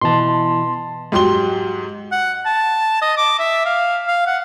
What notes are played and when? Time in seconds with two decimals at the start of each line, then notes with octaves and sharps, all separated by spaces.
0.02 B2 E3 A5 C6
1.12 G#2 F#3 G4 C6 G7
2.12 F#5
2.46 A5
3.02 D#5
3.17 D6
3.39 E5
3.66 F5
4.08 F5
4.27 F#5